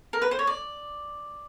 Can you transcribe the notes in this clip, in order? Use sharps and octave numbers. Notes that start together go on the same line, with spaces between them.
A#4
B4
C5
C#5
D5